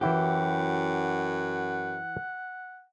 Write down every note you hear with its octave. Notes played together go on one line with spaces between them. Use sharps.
F#2 E3 E4 F#4 G4 F#5